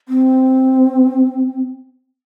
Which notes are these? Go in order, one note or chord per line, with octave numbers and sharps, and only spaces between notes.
C4